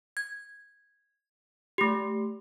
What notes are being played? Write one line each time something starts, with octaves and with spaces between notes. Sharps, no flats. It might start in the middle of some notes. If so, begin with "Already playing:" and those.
G#6
A3 G4